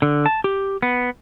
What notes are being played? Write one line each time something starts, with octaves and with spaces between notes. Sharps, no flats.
D3
A5
G4
B3